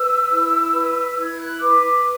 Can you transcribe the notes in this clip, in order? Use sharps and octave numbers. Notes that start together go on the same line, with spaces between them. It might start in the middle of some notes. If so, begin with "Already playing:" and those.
Already playing: B4 E6
E4
B4
E4 G#6
F#6
B4 D6
D6